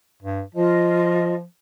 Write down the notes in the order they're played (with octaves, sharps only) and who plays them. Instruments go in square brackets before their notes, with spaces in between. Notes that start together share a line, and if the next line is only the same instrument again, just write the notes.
[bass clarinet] G2
[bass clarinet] F3 [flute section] F4 D#5